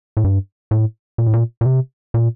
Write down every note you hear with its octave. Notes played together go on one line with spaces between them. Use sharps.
A2
G2
A2
A#2
A2
A#2
A#2
C3
A#2